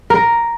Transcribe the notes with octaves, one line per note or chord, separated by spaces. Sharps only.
A#4